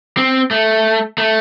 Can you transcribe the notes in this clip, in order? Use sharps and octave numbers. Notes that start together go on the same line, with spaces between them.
C4
A3
A3